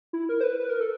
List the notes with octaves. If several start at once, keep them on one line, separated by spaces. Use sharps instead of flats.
E4
A#4
C5
B4
B4
A#4
A4